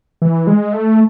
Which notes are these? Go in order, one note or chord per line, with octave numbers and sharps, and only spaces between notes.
E3
G#3
A3